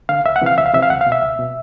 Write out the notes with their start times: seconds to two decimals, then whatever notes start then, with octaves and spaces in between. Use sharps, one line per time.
0.09 D3 F5
0.25 C#2 E5
0.36 F#5
0.41 C3 E3 F5
0.58 C#2 E5
0.66 F5
0.74 C3 E3 E5
0.82 F5
0.90 C#2 F#5
1.01 F5
1.06 B2
1.12 E5
1.22 C#2
1.39 B2